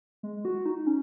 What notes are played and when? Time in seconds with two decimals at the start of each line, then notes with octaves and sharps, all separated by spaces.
0.23 G#3
0.45 F#4
0.66 D#4
0.87 C#4